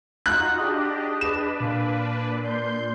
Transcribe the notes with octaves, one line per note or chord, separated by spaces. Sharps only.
D#4 F4 F#4 A#5 F#6
D4 G4 G#4 D#5
D4 B4 E7
A#2 F5
D5 C6 G6